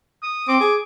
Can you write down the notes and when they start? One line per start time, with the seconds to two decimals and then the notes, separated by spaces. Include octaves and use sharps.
0.23 D#6
0.48 C4 D6
0.60 G#4